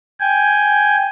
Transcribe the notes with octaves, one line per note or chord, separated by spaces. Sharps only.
G5 G#5